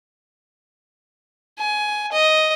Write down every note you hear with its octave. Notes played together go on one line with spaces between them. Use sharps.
G#5
D#5